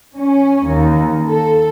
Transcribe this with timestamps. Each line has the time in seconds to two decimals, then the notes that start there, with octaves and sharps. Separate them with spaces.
0.16 C#4
0.66 D#2
1.26 A4